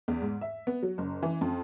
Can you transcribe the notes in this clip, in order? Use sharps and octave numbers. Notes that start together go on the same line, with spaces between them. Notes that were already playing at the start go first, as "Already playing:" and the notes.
E2
G#2
E5
B3
F#3
F#1
E3
F2